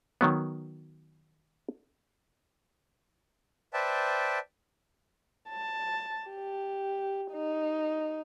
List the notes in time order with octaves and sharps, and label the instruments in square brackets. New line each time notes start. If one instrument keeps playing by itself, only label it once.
[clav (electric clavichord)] D#3 F#3 B3
[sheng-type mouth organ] B4 C5 D5 E5 G5 A5
[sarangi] A5
G4
D#4